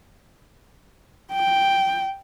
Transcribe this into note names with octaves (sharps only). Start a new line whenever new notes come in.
G5